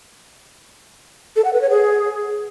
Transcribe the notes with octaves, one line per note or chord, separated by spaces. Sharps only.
A4
F#5
B4
C#5
G#4